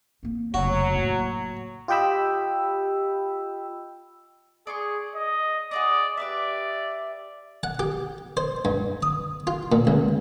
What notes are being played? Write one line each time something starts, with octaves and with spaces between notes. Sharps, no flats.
A#3 C4
F1 C#3 F#3 F#4
A2 A#3
F4 G4 D#5 G5 B5 E6
G#4 D5 C6 C#6
D#5
F#4 G#4 D5 D#5
G4 B4 D5 E5
F#5
G4
C5
G2
D#6
F4
A#2
C#2